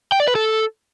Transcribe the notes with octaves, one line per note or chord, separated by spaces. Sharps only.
G5
D5
B4
A4